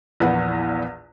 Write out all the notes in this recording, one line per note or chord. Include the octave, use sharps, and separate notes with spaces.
A#1 E2 B4 F#5